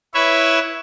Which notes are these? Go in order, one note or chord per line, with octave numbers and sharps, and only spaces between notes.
E4 B4 C#5 E5